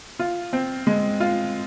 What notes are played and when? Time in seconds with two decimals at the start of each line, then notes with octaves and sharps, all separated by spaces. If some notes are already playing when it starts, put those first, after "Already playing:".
0.19 F4
0.53 C4
0.87 G#3
1.20 F4